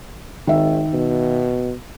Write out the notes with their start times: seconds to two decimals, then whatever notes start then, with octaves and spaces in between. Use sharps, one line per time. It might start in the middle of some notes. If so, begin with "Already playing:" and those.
0.47 G#1 D#3 E5
0.93 B2